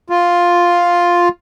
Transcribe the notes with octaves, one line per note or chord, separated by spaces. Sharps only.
F4